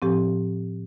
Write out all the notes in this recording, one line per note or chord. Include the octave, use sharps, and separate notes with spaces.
A2 F3 C4 G4